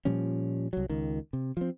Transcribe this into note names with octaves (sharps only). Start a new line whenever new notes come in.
A#2 F3 G3 C#4
C2 F#3
C#2 D#3
C3
F3 C4